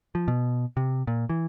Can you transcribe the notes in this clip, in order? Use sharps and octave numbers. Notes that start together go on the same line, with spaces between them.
F3
B2
C3
A#2
E3